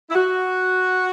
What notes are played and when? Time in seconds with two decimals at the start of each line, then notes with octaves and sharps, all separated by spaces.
0.10 E4
0.15 F#4